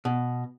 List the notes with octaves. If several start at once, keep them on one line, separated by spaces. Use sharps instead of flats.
B2